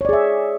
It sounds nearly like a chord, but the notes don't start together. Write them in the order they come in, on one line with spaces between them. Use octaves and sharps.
C#5 D5 G#4 E5